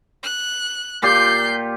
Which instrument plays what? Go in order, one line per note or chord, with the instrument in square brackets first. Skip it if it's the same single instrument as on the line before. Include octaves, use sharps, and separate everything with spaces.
[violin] F#6
[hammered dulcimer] A#2 F4 G4 [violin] G6 C7